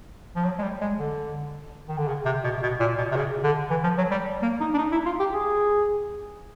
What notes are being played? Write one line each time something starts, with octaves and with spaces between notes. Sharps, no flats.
F3
F#3
G#3
G3
G#3
D3
D#3
D3
C#3
C3
B2
C3
B2
A#2
B2
C3
C#3
D3
E3
F3
F#3
G3
A#3
D#4
D4
D#4
E4
F4
G4
G#4